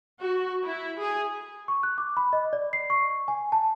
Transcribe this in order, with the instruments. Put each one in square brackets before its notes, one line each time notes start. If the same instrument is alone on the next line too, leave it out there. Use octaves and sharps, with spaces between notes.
[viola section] F#4
E4
G#4
[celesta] C#6
F#6
D6
B5
D#5
D5
C7
C#6
G#5
A5